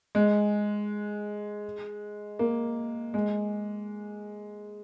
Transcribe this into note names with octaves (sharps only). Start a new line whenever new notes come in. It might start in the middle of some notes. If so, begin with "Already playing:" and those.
G#3
A#3
G#3